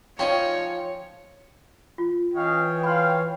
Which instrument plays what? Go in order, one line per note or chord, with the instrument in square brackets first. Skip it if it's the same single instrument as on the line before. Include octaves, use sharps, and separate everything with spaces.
[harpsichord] F3 C#4 [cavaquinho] D#4 E4 G5 [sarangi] C#5
[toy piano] F4
[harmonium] E3 C#5 [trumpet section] C#4 D#5 F5 [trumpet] G5
[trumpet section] F5 [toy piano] B5 C6